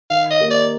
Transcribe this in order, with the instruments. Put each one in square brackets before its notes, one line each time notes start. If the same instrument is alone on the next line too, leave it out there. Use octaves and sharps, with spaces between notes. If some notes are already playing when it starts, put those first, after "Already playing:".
[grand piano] D#3 [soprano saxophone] F5
[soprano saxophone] D#5
[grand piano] A#3 D#4 G4
[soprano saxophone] D5